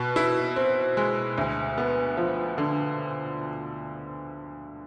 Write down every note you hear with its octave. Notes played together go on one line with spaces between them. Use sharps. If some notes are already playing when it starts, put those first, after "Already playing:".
Already playing: B2
E4
C4
G#3
D2
B3
F3
D3